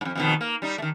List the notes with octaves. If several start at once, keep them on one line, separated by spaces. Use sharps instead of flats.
F2 G#2
F2 B2 D#3
A#3
G3 D#4
D#3 A3